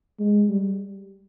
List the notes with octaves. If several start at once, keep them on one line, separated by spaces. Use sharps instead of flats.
G#3
G3